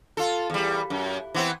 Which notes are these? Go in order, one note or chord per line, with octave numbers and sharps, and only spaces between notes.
F4 A4
E2 G3
F#2
E3 B3 C4